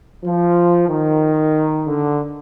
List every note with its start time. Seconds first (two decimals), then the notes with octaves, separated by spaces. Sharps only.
0.24 F3
0.89 D#3
1.86 D3